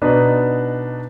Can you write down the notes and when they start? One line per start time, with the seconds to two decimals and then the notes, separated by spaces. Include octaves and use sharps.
0.02 B2 D4 D#4 B4